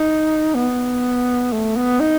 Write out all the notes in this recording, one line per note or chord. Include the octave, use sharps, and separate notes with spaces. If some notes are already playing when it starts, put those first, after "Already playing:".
Already playing: D#4
B3
A3
B3
D#4